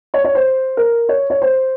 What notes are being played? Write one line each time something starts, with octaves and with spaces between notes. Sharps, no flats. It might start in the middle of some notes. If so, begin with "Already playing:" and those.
C#5
C#5
C5
A#4
C#5
C#5
C5